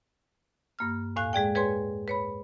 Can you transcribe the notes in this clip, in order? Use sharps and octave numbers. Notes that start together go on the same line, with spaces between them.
G2 A#3 F6
E2 A2 F5 G#5 F#6
G#3 G#4 D5 G5
G#4 B4 C#5 G#5 C6
B4 C#5 B5